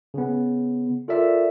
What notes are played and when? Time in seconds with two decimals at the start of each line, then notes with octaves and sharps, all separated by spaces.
0.14 C#3 B3
1.08 F4 A4 A#4 D5 E5